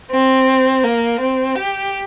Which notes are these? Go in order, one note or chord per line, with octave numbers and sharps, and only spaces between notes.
C4
A#3
C4
G4